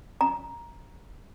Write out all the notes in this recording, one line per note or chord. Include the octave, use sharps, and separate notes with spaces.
A#5